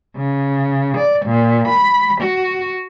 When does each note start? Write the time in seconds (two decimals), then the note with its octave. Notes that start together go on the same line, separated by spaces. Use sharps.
0.15 C#3
0.97 D5
1.25 A#2
1.67 B5
2.20 F#4